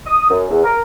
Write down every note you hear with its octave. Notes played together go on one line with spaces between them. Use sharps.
D#6
F#2
E2
A#4